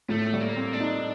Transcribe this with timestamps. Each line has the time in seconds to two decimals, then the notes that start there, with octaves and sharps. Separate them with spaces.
0.09 A2 A3
0.33 G3
0.40 A#3
0.56 C4
0.73 D4
0.80 D#4